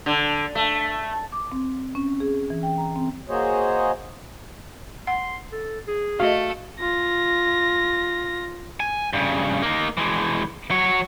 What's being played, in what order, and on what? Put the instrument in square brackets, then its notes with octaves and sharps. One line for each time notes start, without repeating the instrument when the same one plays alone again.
[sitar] D3
A3
[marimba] D6
C4
C#4
G#4
E3
G5
A#5
C4
[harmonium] A#3 F#4 G#4 C5 C#5 D#5
[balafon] F#5 [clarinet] C6
[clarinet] A4
G#4
[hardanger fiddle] A3 [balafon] F#4 D#5 [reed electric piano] F5
[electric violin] F4 A#6
[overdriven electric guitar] G#5
G2 C#3
A#3 D#4
E3 G#3
F#3 C#5